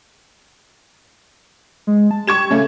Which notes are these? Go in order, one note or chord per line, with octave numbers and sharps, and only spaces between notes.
G#3
A5
G4 C#6 G#6 E7
C#3 A3 C#4